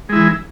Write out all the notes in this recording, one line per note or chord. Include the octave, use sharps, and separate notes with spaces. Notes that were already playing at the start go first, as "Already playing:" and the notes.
E3 G#3 E4